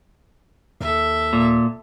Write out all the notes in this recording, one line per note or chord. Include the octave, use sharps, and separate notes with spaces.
D#2 A4 E5
A#2